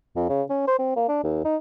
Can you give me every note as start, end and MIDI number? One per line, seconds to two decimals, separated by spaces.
0.16 0.27 41
0.29 0.43 49
0.50 0.62 61
0.67 0.77 72
0.79 0.96 60
0.96 1.08 58
1.08 1.21 62
1.24 1.43 39
1.45 1.57 63